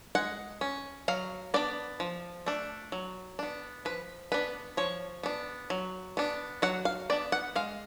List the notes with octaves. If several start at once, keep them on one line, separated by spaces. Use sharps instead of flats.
G#3 F#5
C#4
F#3 F5
B3 D4 D5
F3
A3 D4
F#3
B3 D4
F3 B4
B3 D4 B4
F3 C#5
B3 D4
F#3
B3 D4
F#3 F#5
F5
B3 D4 D5
F#5
G#3 F5